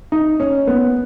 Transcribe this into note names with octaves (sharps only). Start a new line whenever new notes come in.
D#4
C#4
B3